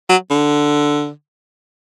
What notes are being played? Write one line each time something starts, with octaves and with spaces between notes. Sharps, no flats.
F#3
D3